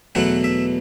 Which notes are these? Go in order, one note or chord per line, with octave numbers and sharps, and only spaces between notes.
E2 B2 F#3 A3 E4 F#5
E5